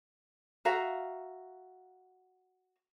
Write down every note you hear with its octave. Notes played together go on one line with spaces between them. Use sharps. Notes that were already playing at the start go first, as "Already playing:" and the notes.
F#4 E5 F5 A#5